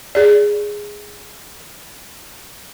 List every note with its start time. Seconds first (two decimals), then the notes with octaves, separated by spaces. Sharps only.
0.15 G#4 D5